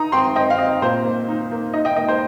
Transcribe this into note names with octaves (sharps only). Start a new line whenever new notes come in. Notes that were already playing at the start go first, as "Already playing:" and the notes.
Already playing: D#4 A#5 D#6
C4 G5 C6
C4 D#5 G5
F5
C4 D#5
A#2 C5
A#3
D#4
A#3
D#4 D#5
D#5 G5
A#3 D#5
C5